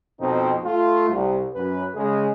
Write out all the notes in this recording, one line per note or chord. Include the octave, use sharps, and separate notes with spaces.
F2 B2 C4 D#4
A3 F4
C2
F#2 B4
C#3 G#3 G#4